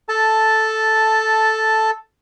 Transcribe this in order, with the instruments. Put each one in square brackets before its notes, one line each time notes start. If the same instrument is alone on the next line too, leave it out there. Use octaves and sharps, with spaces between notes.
[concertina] A4 A5